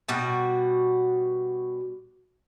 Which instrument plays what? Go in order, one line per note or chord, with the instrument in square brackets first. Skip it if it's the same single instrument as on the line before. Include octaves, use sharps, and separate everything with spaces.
[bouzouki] B2 G3 F#4